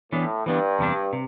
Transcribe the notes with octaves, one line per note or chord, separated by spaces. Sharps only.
A2 E3 B3 D4
G2 E3 B3 D4
E2 C3 G3 D4
C3